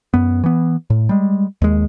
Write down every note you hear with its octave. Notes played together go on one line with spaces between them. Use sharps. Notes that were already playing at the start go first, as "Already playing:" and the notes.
F#2 B3
E3 B3
A2
G3 G#3
D#2 G#3